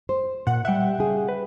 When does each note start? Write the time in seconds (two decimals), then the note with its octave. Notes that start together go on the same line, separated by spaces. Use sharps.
0.09 C5
0.47 A#2 F#5
0.65 G3 E5 F#5 G5
0.98 C#3 G#4
1.29 B4